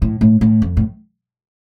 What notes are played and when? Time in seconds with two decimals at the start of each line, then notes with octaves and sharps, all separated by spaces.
0.02 A2
0.21 A2
0.41 A2
0.62 F2
0.77 A2